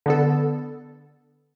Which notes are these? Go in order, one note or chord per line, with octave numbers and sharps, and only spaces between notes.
D3 B3 A4